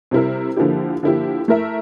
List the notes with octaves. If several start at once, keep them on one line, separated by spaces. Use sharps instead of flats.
C3 G3 C4 E4 A#4
D3 F3 A#3 E4 G4
D3 F3 A#3 E4 G4
A3 E4 A#4 E5